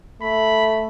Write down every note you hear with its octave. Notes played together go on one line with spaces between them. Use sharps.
A3 B5